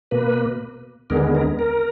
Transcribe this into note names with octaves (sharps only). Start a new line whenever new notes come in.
B2 A#3 B4
D#2 D3 G#3 B3 A#4
A#4
A#4